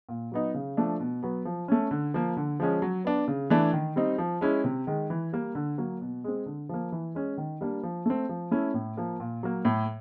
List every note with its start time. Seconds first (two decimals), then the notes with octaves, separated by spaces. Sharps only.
0.09 A#2
0.32 F#3 B3 D#4
0.54 C#3
0.77 F3 A3 D4
1.00 B2
1.23 F#3 B3
1.45 F3
1.68 A3 C#4
1.91 D3
2.14 F3 A#3
2.37 D3
2.60 F3 G#3 C#4
2.82 F#3
3.05 B3 D4
3.28 C#3
3.50 E3 A3 D4
3.73 D#3
3.96 G3 C4 D#4
4.18 F3
4.41 G#3 C#4 E4
4.64 C3
4.87 D#3 G#3
5.10 E3
5.33 G3 A#3
5.55 D3
5.78 F#3 A#3
6.01 B2
6.24 G#3 C4
6.46 D3
6.69 F3 A#3
6.92 E3
7.15 G#3 C#4
7.38 D#3
7.61 G3 A#3 D4
7.83 F3
8.06 A3 C4
8.29 F3
8.51 A3 C#4 E4
8.74 A2
8.97 F3 A#3
9.20 A#2
9.43 F#3 A#3
9.65 A2